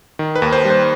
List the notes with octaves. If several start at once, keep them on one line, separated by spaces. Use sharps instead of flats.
D#3
B4
D#2
C5
G3
C5